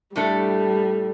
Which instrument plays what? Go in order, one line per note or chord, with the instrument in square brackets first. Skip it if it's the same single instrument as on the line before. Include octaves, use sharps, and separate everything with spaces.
[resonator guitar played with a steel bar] A2 A3 D4 A4 [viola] G3